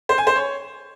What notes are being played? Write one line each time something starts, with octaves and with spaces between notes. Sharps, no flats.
C5
G#5
C5
C#5